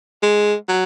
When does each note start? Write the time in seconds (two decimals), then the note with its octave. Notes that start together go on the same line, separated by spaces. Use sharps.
0.23 G#3
0.69 F#3